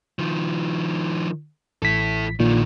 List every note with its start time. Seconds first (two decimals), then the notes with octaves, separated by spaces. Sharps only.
0.19 D#3 F3
1.82 A1 E4 A4 B6
2.40 A#1 A#2 D3 D#3